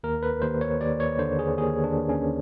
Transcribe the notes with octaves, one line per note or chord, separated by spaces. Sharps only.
D#2 A#4
B4
D#2 C5
C#5
D#2 D5
C#5
D3 C5
G#4
D#2 G#4
D4
D#2
C#4